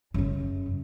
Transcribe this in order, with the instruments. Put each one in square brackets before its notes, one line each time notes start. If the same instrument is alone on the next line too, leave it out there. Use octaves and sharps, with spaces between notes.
[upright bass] F#2 C#3